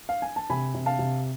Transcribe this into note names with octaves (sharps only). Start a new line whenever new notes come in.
F5
G#5
A5
C3 G#5 B5
C3
F5 A5
C3